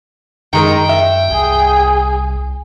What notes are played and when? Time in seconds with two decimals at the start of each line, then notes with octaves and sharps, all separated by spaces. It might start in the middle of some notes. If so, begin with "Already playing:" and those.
0.53 F#2 D#3 G#3 A#4 G5
0.89 E5
1.31 C2 G#4